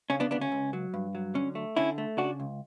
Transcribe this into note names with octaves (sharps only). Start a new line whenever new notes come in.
C#3 C#4
B3 D4
D2 B3 D4
C#4
C#2
F#3
G2
F#3
D3 C#4
A3
D3 C#4 E4
A3
C#3 D4 F#4
C#2